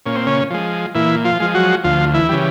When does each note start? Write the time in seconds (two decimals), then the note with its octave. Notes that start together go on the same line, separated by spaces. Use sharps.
0.06 A#2 C#4
0.16 C4
0.27 C#3 C#4
0.50 F3 G#3
0.95 A#2 E3 E4
1.25 F3 F4
1.40 F3 G#3
1.54 F#3 F#4
1.84 D2 F3 F4
2.14 E3 E4
2.29 C#3 E3 G3